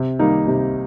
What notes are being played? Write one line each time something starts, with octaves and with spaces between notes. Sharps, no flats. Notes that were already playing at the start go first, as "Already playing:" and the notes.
Already playing: C3
D#3 G3 A#3 D#4
C3